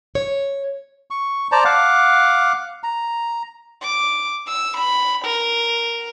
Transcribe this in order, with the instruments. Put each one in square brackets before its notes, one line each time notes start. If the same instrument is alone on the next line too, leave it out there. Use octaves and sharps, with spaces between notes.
[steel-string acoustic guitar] C#5
[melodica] C#6
C5 D5 A5 A#5
F5 F#5 D6
A#5
[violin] D6
E6
B5
A#4